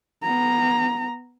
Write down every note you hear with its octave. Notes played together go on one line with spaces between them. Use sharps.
B3 A#5